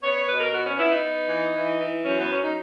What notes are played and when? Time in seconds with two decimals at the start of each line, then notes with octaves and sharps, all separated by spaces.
0.03 B3 C#5
0.15 C#5
0.28 B2 B4
0.40 A#4
0.53 B3 F#4
0.66 C#4
0.78 B3 E4
0.91 D#4
1.04 B3
1.29 E3
1.55 E3
1.80 E3
2.05 F#2 C#4
2.18 B3
2.30 F#3 C#4
2.43 D#4